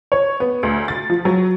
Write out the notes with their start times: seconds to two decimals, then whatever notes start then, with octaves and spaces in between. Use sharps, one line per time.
0.12 C#5
0.40 B3
0.63 D2
0.88 A6
1.10 F3
1.25 F#3